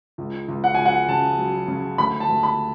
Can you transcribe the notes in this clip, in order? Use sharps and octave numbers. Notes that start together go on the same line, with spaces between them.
C#2
C#2
F#5
C#2 G#5
F#5
C#3 A5
F#3
C#3
D2 B5
A5
D2
B5